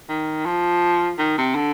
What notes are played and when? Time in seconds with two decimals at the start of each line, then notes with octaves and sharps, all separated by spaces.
0.09 D#3
0.46 F3
1.19 D#3
1.38 C3
1.55 D3